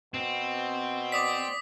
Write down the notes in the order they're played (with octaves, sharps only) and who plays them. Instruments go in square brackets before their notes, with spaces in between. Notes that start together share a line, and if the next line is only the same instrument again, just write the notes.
[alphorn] B2 [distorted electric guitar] C4
[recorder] D5 [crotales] D6 D#6 B6